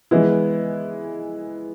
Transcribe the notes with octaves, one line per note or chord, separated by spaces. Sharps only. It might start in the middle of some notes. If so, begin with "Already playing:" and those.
E3 G#3 B3 E4